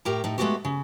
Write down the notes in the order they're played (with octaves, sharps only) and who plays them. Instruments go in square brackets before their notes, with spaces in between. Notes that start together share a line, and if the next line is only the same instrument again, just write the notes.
[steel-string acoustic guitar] A2 G4 A#4 A#5
A2 D#4
G#3 A3 B3 C4 F#4 G4
C#3